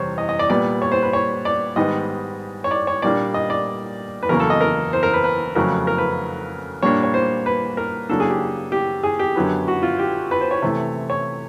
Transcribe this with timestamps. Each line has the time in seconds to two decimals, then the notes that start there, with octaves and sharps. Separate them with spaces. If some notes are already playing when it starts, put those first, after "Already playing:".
Already playing: E2 C3 G3 C5 C#5
0.18 D#5
0.29 D#5
0.39 D5
0.50 A#2 G3 B3 D5
0.82 C#5
0.92 C5
1.03 B4
1.13 C#5
1.45 D5
1.76 G#2 D#3 G3 B3 D#5
2.64 C#5
2.71 D5
2.87 C#5
3.02 A#2 G3 A#3 D4 D5
3.34 D#5
3.50 D5
4.23 B4
4.29 E2 C#3 F#3 A#3 A#4
4.40 A4
4.50 D#5
4.61 A#4
4.93 C5
5.03 A#4
5.14 B4
5.24 B4
5.55 F2 C#3 F#3 A3 A#4
5.87 A#4
5.98 B4
6.83 A#2 G3 A#3 D4 C#5
7.03 C#5
7.14 C5
7.46 B4
7.77 A#4
8.09 C#3 F#3 A#3 D4 A4
8.20 G#4
8.30 G4
8.72 G4
9.03 G#4
9.19 G4
9.35 F#2 D3 F#3 B3
9.68 F#4
9.83 F4
9.99 G4
10.31 B4
10.41 C5
10.51 C#5
10.62 C3 E3 A3
11.10 C#5